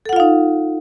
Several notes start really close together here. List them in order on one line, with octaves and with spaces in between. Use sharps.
A4 F#5 F4 F5 D#4